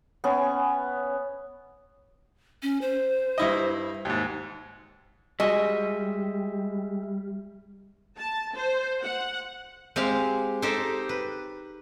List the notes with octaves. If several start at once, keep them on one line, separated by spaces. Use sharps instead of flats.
B3 C#4 G#5
C#4
C5
G2 E4 D#5
D#2 G#2
G3 G#3 F#4 D#5 E5 G#5
A5
C5
F#5
G#3 C4 G4 F5
D#4 G4 A4 C5
B4